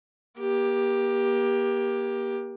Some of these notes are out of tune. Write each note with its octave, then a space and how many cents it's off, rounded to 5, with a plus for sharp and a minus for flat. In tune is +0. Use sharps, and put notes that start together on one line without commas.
A#3 +35 G4 +10